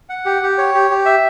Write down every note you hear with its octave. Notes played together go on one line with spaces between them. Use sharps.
F#5
G4
G4
C#5
G4
G4
E5